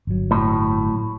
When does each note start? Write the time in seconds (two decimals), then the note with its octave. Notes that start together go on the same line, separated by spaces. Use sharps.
0.07 G1 F#3
0.31 A2